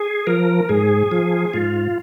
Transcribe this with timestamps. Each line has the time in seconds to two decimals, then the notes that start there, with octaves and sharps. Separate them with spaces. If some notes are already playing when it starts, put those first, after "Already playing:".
Already playing: G#4
0.27 F3 A#4
0.69 G#2 G#4
1.11 F3
1.54 G#2 F4